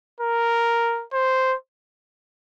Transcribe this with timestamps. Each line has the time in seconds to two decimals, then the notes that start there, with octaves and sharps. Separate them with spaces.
0.21 A#4
1.13 C5